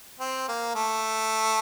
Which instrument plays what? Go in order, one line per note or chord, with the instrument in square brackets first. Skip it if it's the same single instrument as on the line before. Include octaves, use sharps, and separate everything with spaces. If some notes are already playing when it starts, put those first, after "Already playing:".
[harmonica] C4
A#3
A3